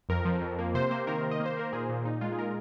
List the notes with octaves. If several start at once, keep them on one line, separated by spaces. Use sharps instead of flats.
F2 A#4
F3
F2
A#3
C3 C5
A#3 C5
D#3 A#4
D#3
D#5
A#3
C5
A#3 A#4
A#2 G#4
A#2
A#2 D#4
G#3 F4
G#4
A#2 A#4